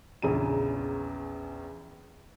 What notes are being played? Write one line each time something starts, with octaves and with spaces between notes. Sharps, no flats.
A#1 E2 C#3 A#5 D#7